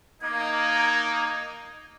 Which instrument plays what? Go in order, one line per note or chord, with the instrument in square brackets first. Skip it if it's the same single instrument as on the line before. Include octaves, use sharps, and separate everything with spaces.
[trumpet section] A#3 D#4 [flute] G#6